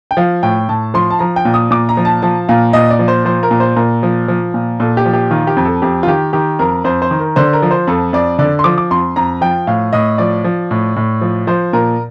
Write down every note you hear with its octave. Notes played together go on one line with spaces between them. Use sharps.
G5
F3 F5
A2 G5
A2 A5
F3 C6
A5
F3 A#5
G5
A#2
D#6
A#2 D6
A#5
F3
A5
F3 A5
A#2 F5
A#2 D#5
D5
F3
C5
F3 C5
A#4
A#2
C5
A#2 A#4
F3
F3
A#2
A#2 A4
G4
F3
G4
D#3 F4
G4
F2
A4
F2 G4
F4
D#3 G4
D#3 G4
F2 A#4
F2 C5
C5
D#3
A#4
D3 C5
A#4
F3
C5
F2 A4
F2 D5
D3 D5
C6
F3 D6
D6
F2 C6
F2 A#5
F3 G5
A2 F5
A2 D#5
F3 D5
F3
A2
A2
F3
F3 C5
A#2 A#4